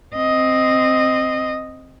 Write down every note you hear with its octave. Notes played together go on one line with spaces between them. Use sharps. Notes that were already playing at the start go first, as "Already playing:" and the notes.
C4 D#5